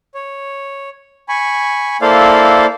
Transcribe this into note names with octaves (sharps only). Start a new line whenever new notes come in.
C#5
G#5 B5 C#6
A#3 E4 A4 C5 D5 F5